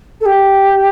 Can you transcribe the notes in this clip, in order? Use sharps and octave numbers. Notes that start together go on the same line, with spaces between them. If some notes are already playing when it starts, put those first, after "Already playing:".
A4
G4